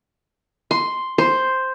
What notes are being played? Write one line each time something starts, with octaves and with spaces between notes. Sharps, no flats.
C6
C5